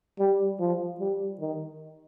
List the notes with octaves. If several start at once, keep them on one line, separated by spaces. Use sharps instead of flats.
G3
F3
G3
D#3